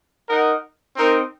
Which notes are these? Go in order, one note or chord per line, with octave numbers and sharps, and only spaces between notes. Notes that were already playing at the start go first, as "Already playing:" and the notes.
D#4 A#4 D#5 F#5
C4 D#4 A#4